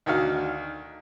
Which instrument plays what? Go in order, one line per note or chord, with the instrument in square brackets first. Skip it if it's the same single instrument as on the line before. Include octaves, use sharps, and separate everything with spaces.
[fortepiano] D2 D#3 F#4 F5